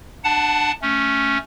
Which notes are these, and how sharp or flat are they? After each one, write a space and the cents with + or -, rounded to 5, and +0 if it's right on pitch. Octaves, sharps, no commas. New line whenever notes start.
D4 +30 F#5 +0 A5 +0
A3 +0 C#4 +0